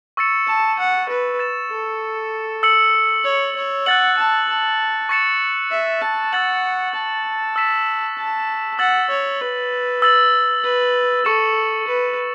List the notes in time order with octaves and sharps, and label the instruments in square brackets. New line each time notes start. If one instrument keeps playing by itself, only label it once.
[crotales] C#6 E6 A6 C#7 E7
[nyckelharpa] A5
F#5
B4
[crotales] A6 E7
[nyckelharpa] A4
[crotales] E6 C#7 F#7
[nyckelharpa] C#5
C#5
[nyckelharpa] F#5 [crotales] F#6 A6 F#7
[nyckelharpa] A5
A5
[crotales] C#6 A6 C#7 E7
[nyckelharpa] E5
A5
[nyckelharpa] F#5 [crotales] E6 A6 F#7
[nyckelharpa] A5
[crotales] E6 B6 E7
[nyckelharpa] A5
[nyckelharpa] F#5 [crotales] E6 A6 F#7
[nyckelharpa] C#5
B4
[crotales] E6 A6 F#7
[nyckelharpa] B4
[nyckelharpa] A4 [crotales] C#6 E6 C#7 E7
[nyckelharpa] B4